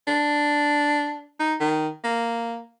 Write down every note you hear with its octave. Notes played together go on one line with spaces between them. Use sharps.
D4
D#4
D#3
A#3